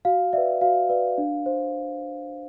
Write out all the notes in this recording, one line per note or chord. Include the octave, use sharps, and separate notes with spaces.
F#4 F5
B4 D5 E5
F#4 F5
B4 D5
D4
C5